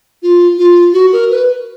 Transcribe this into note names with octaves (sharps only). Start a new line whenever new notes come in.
F4
F4
F#4
A#4
B4